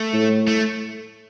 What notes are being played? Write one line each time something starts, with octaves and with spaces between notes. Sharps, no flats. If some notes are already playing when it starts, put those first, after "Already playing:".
Already playing: A3
A2
A3